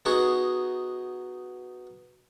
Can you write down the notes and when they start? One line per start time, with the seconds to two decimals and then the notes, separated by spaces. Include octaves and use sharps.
0.05 B3 D#4 F#4 G#4